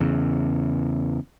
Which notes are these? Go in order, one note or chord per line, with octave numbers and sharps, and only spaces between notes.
E2 C#3